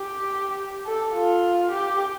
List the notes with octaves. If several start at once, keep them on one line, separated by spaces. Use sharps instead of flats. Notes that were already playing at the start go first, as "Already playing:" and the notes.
Already playing: G4
A4
F4
G4